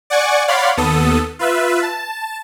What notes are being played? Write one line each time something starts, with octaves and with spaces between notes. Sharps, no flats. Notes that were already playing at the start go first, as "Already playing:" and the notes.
D5 F#5 G#5 C#6 D6
C#5 D5 F5 F#5 B5 C6
D#2 B3 A4 D#6
F4 B4 E5
A5